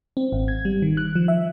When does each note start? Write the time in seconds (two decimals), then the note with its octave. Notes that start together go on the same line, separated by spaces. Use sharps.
0.17 C4
0.32 G#1
0.48 G#6
0.65 G3
0.82 D#3
0.97 F#6
1.15 F3
1.28 E5